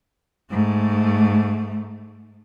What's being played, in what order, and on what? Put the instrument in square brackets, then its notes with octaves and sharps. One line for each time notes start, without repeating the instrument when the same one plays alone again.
[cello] G#2 A3